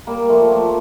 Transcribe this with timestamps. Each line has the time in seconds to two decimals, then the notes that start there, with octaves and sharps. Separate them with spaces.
0.07 G3 A#3
0.29 F3 A3
0.52 F3